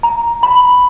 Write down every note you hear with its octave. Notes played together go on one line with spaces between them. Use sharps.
A#5
B5